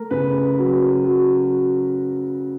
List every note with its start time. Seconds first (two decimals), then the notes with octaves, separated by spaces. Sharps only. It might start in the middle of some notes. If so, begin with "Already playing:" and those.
Already playing: A3 A#4
0.11 C#3 B4
0.59 F#3
1.05 F#3